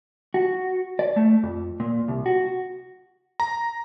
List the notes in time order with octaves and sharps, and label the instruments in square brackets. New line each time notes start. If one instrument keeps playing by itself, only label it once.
[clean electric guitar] F#4
D5
A3
F2
A#2
C2
F#4
[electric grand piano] A#5